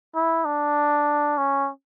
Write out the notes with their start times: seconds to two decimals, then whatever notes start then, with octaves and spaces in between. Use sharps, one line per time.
0.15 E4
0.45 D4
1.37 C#4